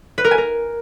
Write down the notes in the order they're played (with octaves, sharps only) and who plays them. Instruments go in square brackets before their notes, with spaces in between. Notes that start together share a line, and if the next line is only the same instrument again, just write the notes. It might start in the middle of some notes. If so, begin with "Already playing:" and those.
[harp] B4
A#4
G#5
A#4